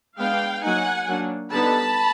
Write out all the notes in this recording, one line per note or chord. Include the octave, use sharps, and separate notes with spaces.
G#3 B3 D4 F5 G5
F#3 A#3 D#4 F#5 G#5
F#3 A#3 D4
D3 G3 B3 D#4 A5 B5